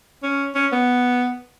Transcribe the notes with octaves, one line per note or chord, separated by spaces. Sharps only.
C#4
C#4
B3